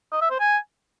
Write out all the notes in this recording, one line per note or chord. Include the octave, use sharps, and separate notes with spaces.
D#5
E5
C5
G#5